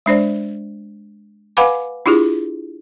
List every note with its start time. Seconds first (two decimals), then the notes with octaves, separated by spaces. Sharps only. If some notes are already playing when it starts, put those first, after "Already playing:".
0.06 G#3 D4 C5 D5
1.57 B4 F5 F#5 G#5 B5 D6
2.06 D4 E4 F4 G4 G#4